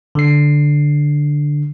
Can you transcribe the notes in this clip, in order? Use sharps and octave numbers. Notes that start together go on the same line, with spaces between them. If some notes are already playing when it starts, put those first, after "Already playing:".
D3 C7